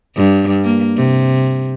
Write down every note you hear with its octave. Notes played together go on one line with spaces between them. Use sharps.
G2
A#3
C3